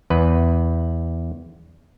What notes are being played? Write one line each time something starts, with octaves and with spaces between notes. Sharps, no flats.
E2 B4